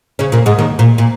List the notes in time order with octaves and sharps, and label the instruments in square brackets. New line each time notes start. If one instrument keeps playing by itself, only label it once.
[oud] C#3 C#4
A#2 A#3
G#2 G#3
D#2 D#3
A#2
A#2